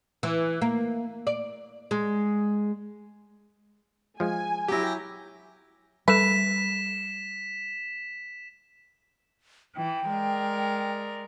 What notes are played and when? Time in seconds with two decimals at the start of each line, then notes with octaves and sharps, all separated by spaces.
0.23 E3
0.62 A#3
1.27 D5
1.91 G#3
4.20 F3 G#3 G#5
4.68 F#3 E4 G4 A#6
6.08 G3 A3 B4 B6 E7
9.77 E3 G5
10.10 G#3 A#4 D5